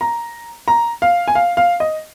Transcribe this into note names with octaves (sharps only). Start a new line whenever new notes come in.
A#5
A#5
F5
G#5
F5
F5
D#5